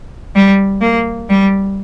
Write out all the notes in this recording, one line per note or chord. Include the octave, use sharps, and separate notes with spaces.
G3
A#3
G3